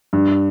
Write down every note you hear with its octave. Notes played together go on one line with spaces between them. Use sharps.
G2